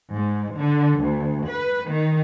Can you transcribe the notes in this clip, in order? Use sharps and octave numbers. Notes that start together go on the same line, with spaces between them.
G#2
D3
D2
B4
D#3